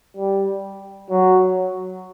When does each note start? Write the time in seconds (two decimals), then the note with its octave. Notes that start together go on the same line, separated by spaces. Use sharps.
0.17 G3
1.10 F#3